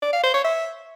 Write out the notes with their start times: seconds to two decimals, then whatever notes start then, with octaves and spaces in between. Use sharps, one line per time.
0.03 D5
0.13 F5
0.23 C5
0.34 C#5
0.44 E5